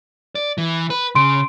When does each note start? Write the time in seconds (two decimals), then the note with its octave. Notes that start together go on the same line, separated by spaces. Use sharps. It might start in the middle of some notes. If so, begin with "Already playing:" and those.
0.35 D5
0.58 E3
0.90 B4
1.15 C#3 C6 D7